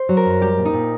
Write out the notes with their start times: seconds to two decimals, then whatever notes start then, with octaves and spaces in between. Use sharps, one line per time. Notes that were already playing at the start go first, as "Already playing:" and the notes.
Already playing: C5
0.09 F#3
0.17 A#4
0.25 F#2
0.41 G3 G4
0.58 A#2
0.65 D#4
0.73 A#2